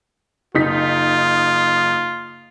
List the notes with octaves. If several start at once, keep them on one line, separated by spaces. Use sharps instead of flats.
F#1 D#4 F4 B6